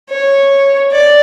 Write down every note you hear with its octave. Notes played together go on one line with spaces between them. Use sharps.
C#5
D5